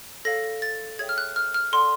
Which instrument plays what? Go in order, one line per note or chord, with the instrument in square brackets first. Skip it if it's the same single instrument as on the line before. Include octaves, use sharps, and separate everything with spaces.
[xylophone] A4 C#5 F5 A#6
A6
G#4 C#5 E5 G5 G#6
F6
F#6
F6
F6
A4 D5 F#5 C6